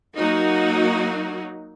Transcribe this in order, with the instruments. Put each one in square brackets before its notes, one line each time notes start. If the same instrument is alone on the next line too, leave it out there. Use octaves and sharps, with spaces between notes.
[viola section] F#3 A#3 D#4 F#4